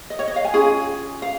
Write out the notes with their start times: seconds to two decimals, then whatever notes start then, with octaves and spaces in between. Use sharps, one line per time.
0.10 D#5
0.19 C#5
0.28 D#5
0.36 F5
0.45 G#5
0.54 C#4 F4 G#4
1.22 F5